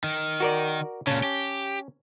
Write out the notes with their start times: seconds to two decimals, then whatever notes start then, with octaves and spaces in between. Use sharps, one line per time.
0.04 D#3
0.40 F#4 A#4 D5
1.07 A#2 C#3 C#4 A5
1.23 G4